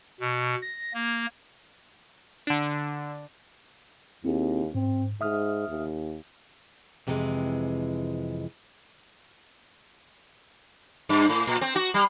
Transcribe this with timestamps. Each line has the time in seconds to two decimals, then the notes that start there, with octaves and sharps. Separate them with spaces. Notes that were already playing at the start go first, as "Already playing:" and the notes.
0.20 B2
0.62 A#6
0.94 A#3
2.47 D3 D4
4.25 D#2 C4 E4 G#4
4.75 G#2 C4
5.21 G#2 E5 D#6 F6
5.68 D#2
7.07 F2 C3 E3 G3 G#3
11.09 G2
11.29 A2
11.47 A#2
11.61 C4
11.76 F#4
11.94 G3